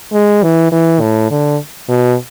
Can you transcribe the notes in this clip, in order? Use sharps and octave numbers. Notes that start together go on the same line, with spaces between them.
G#3
E3
E3
A2
D3
B2